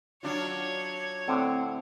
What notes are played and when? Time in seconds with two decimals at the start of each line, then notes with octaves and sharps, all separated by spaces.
0.23 F#3 D4 F4 C#5
1.28 A2 D3 C4